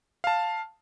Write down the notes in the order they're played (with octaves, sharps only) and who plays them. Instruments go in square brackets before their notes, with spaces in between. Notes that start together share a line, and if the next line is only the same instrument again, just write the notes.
[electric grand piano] F5 A5